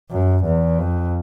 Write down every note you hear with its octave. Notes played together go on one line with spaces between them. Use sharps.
F#2
E2
F2